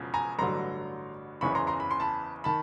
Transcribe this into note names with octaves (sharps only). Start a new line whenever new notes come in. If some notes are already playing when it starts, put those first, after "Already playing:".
Already playing: E1 E2 C#3 F3
G#5 A#5
A1 G2 D3 F#3 A#5 C6
F#1 E2 C#3 E3 B5 C#6
A#5 C6
A#5 C6
B5
C6
A5 B5
D#3 A5 B5